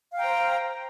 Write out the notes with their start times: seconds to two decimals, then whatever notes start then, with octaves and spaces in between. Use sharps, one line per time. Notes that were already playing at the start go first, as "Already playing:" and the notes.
0.13 F5
0.16 G5
0.19 A#5
0.22 C5